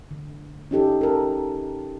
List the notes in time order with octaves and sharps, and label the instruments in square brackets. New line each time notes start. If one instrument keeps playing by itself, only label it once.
[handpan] D3
C#4 D#4 G4 A4
A4 A#4